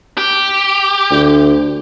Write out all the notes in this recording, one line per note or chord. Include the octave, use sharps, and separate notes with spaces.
G4
D2